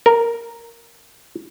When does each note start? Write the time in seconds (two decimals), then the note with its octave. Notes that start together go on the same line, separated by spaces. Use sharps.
0.06 A#4